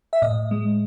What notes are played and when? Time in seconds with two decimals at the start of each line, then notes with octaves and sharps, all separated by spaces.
0.13 E5
0.22 A2 D#5
0.51 G#3